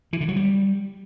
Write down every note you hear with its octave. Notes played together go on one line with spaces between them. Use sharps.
E3
D3
F#3
G3